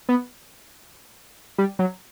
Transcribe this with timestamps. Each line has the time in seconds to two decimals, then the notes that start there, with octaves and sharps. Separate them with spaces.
0.09 B3
1.58 G3
1.79 F#3